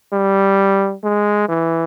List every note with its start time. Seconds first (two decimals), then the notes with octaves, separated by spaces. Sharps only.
0.13 G3
1.04 G#3
1.49 E3